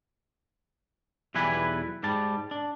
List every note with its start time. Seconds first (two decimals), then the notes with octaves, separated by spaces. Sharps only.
1.35 B1 E2 G3 E4 B4 G#5
2.03 G#2 G3 A5
2.51 D4